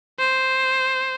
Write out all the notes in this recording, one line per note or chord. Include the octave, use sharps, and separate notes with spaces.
C5